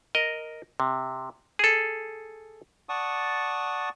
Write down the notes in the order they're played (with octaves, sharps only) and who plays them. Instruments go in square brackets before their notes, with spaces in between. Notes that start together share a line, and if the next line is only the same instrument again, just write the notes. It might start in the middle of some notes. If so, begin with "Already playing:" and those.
[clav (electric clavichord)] A#4 D#5
C3
G#4 A4
[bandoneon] D5 F#5 A5 C#6 D#6